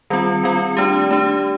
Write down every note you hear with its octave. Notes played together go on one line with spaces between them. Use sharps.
D#3 G3 C4 F4
D#3 G3 C4 F4
A3 D4 G4
A3 D4 G4